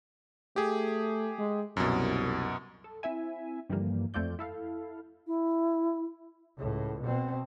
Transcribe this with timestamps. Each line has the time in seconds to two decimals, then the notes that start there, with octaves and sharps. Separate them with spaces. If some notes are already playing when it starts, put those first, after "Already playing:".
0.56 A3 G4 G#4
1.39 G#3
1.77 C2 F#2 B2
2.84 A4
3.03 C4 E4 E5 G#5
3.70 G2 D3 E3 F3 G3 A#3
4.14 F2 A3 C4 F4 D5 G6
4.39 E4 A4 F5
5.27 E4
6.58 C#2 A2
7.01 B2 C4